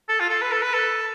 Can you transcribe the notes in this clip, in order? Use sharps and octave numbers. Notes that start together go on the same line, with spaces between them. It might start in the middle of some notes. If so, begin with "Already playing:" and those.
A4
F4
A4
B4
A4
B4
A4